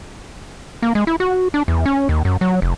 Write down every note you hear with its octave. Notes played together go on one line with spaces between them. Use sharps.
A#3
G#3
E4
F#4
D4
E2
C#4
D#2
F#2
F#3
F1